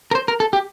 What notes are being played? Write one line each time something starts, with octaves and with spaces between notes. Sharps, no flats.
A#4
C5
A#4
A4
G4